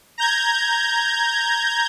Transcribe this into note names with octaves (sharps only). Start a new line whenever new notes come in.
A#5 G6 G#6